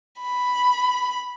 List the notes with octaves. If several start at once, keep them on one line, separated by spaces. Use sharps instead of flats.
B5